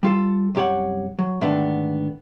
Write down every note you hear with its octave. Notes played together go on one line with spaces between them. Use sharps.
G3 F4 A4
C2 F#2 G4 C#5 F#5
F#3
G#2 D3 D#3 A3 B3 D4